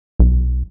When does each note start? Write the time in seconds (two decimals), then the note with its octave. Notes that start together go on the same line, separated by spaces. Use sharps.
0.19 B1